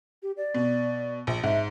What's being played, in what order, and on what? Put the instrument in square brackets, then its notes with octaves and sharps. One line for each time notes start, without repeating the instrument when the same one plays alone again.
[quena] G4
D5
[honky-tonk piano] B2
A#1
[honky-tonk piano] G#2 [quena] E5